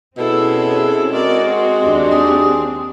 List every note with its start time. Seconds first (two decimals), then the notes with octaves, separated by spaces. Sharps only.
0.18 B2 C4 C#4 E4 G#4 A4
1.12 G#3 F#4 A#4 D5
1.45 C4
1.79 D#2 D4 G4
2.11 G#4